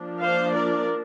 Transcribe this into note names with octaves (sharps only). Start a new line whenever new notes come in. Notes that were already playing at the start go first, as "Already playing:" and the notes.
Already playing: F3 A#3 D4
C5 F5
A#4 D5